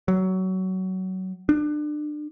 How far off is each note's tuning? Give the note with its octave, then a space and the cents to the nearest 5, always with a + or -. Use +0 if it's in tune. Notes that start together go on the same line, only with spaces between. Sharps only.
F#3 +20
D4 +30